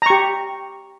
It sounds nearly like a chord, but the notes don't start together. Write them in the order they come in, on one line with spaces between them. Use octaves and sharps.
A#5 C#6 G4